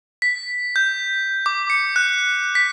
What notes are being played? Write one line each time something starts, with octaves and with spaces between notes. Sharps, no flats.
B6
G6
D6
C#7
F#6
B6